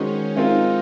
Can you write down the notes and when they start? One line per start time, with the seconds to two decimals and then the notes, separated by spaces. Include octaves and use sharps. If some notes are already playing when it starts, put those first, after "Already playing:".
Already playing: D#3 G#3 C#4 D#4 F#4 C5
0.36 G#3 C4 D#4 F4 A#4